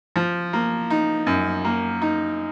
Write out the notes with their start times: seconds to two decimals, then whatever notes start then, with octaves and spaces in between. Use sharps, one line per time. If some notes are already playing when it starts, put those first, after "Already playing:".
0.16 F3
0.53 A#3
0.90 D#4
1.27 F#2
1.64 A#3
2.02 D#4